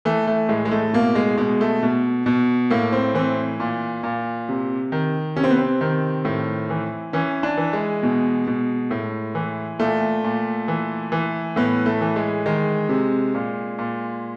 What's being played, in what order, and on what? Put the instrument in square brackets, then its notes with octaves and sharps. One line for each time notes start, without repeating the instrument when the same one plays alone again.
[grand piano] E3 A3
A3
A2 G#3
G#3
A3
B2 A#3
G#3
B2 G#3
A3
B2
B2
A2 A#3
C4
E3 C4
A#2
A#2
C3
D#3
C3 C#4
C4
B3
C4
D#3
A2
E3
E3 C#4
D4
E3
G#3
B2
B2
A2
E3
A#2 A3
A#2
E3
E3
A2 B3
A3
E3
G#3
D#3 G#3
C3
A#2
A#2